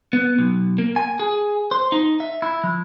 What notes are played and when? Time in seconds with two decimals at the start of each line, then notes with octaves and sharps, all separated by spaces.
0.13 B3
0.39 B1
0.78 A#3
0.96 G#5
1.19 G#4
1.71 C5
1.92 D#4
2.20 E5
2.42 E4
2.64 F3